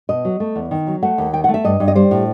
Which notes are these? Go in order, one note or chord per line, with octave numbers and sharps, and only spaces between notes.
B2 D#5
F#3
A3
E2
D#3
F#3
A3 F#5
D#2
D#3 G5
F#5
A3
E5
G2 D#5
G2
D#5
G3 C5
A2